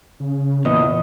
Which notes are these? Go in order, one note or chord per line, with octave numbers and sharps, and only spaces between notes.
C#3
E2 A#2 D#5